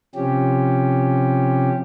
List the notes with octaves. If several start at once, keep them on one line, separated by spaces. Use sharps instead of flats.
C3 F3 C#4 G4